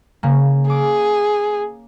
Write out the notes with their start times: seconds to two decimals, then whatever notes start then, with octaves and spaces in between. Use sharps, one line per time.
0.23 C#3 A#3
0.70 G#4 D6